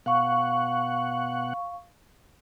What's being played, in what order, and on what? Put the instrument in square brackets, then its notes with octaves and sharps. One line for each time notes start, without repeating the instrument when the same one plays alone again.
[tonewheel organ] B2 F#5 [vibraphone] F5 C#6